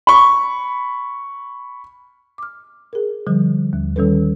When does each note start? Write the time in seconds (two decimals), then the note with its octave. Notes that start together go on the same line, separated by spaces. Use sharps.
0.07 B5 C#6
2.38 D6 F6
2.93 G#4 A#4
3.27 D3 F3 G3
3.73 D#2
3.96 D#3 G3 C#4 A4 B4